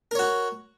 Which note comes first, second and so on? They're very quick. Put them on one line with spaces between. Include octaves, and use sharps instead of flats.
A#4 C#5 F#4